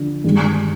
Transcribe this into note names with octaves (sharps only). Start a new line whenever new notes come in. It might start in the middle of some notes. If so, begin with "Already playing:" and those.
Already playing: D3 F3
G2 D#3 G#3